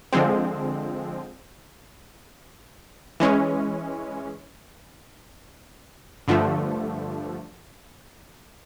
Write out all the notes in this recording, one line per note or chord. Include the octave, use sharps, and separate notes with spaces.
D3 F3 G#3 C4
E3 G#3 C#4
G2 D3 F3 A3